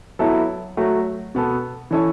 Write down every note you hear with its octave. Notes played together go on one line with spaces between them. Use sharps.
F#3 B3 E4 A4
F#3 A3 F#4
B2 B3 A4
E3 C#4 A4 C#5